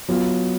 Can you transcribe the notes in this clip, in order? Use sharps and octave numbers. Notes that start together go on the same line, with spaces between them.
F#3 B3 F4